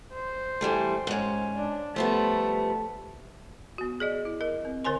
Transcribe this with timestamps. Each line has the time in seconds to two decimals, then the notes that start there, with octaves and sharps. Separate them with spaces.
0.13 C5
0.61 E3 G3 A3
1.07 G#2 C#4
1.56 D4
1.96 F3 G3 A3 B3
3.78 B3 F#4
4.00 G#4 D5 D#5
4.25 E4
4.41 A#4 D#5
4.65 C4
4.84 D3 A#4 C5 G#5 C6